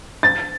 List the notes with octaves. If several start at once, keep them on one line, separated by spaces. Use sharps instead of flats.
A6